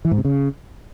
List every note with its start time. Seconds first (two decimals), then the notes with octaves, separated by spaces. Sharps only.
0.05 E3
0.11 G#2
0.18 C3
0.25 C#3